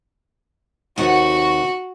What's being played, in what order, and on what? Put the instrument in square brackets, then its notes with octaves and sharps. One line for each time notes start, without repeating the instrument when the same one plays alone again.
[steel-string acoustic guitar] D#2 C3 F#5 [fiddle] F#4